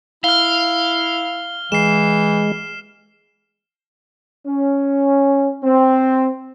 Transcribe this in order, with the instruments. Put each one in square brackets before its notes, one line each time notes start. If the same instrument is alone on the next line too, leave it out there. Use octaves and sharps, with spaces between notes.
[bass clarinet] E4 [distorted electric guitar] F5 [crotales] F6 G7
[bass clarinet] E3 [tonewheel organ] G#3 [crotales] C7 E7
[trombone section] C#4
C4